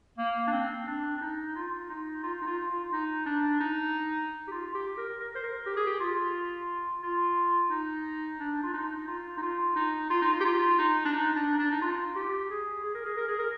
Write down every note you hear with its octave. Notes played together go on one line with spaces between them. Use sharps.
A#3
D4
C4
D4
D4
D#4
F4
D#4
F4
D#4
F4
F4
D#4
D4
D#4
G4
F4
G4
A#4
A#4
C5
A#4
G4
G#4
G4
F4
F4
D#4
D4
F4
D#4
F4
D#4
F4
D#4
F4
D#4
F4
G4
F4
D#4
D4
D#4
D4
D4
D#4
F4
G4
G#4
G#4
A#4
G#4
A#4
G#4
A#4